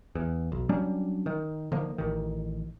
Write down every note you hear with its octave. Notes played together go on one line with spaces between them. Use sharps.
E2
B1
F#3 G3 C#4 D4
D#3
D3 D#3 F3 A#3
A1 D#3